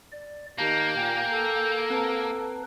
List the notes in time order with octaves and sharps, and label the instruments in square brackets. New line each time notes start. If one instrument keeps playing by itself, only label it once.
[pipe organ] D5
[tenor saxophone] D#3 [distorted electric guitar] A#3 [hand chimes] G4 A5 [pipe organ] A#5 G6
[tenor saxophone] A#2 [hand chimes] G5 G#5
[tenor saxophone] A4
[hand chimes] C4 A5 A#5 [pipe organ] B4